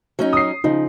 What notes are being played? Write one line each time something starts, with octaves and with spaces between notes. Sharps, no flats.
F#3 C#4 D#4
D#6 C7
C#3 F3 D#4